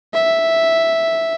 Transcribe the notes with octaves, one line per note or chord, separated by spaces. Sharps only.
E5